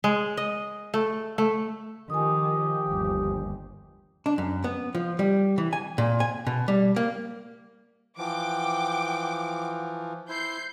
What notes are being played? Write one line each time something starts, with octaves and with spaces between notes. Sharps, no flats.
G#3
D#5
A3
A3
D#3 F3 G4 G#5 D#6
G1 D#2
D4
F#2
B3
F3
G3
E3
G#5
A#2
G#5
B2
G3
A#3
E3 F3 F#5 G5 D6
E4 C5 G6 C7